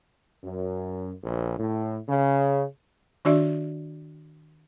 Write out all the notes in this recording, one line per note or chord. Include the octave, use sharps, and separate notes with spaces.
F#2
A#1
A2
C#3
D#3 D4 F#4 D5 E5